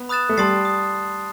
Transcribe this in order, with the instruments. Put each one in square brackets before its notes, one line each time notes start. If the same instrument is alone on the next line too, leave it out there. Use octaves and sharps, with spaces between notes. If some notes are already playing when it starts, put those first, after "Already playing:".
Already playing: [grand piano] B3
[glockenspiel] B5 D#6 F#6 A6 E7
[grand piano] A3
[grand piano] G3 [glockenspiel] A5 C6 D#6 A6 C7
[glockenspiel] D#6